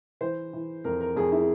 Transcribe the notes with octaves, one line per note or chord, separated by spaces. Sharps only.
E3 C5
E3
F2 A#4
A#4
F2 G#4
E4